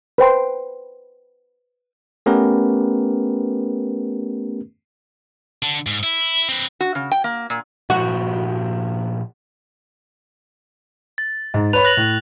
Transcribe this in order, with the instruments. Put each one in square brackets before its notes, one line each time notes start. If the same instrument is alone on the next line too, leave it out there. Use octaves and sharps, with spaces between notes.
[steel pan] B4 C5 G5 C6
[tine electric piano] A3 B3 C#4 G4 A#4 B4
[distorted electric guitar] D3
G#2
E4
C4 B4
[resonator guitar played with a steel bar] F#4
C#3
G5
A#3
A#2
[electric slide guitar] A#2 F3 G4 [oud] F#4
[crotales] A6
[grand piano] G#2
[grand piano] B4 C#5 B5 [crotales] F7
[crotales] F#6 A#6 F#7
[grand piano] A2